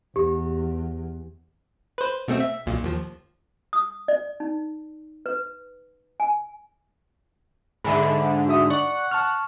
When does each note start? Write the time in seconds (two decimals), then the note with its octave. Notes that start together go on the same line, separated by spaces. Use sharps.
0.16 E2 G4
1.98 B4 C5
2.28 B2 A3 C4
2.40 E5
2.66 B1 A#2
2.84 D#2 F3
3.73 D#6
4.08 D5
4.40 D#4
5.26 B4
6.20 G#5
7.84 G#2 D3 E5 G#5 B5
8.48 F#4 E5 D#6
8.70 D5 F#5 C#6
9.11 A5 C#6 F6